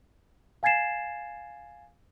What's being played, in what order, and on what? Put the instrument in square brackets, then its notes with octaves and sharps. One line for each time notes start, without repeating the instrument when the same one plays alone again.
[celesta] F5 G#5 G#6 A6 C7 E7